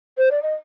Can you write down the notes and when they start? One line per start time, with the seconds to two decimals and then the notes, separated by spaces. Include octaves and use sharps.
0.18 C5
0.31 D5
0.42 D#5